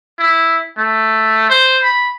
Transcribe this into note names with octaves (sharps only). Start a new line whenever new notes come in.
E4
A3
C5
B5